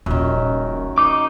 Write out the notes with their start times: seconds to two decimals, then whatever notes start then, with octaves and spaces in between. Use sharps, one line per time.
0.06 D#1 A#1 F#2 D#3
0.98 D#4 D6